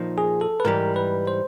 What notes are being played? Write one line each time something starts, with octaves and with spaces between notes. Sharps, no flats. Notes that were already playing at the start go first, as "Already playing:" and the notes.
Already playing: A#2 F3 A#3 D#4
G#4
A4
B4
G#2 E3 G3 A#4
B4
C5